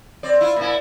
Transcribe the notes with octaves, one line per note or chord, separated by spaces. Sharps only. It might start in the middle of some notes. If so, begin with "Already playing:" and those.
C4 D5
E4 F4
A#2 E4